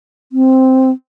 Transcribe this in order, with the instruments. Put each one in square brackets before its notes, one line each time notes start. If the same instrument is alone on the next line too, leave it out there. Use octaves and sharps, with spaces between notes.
[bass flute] C4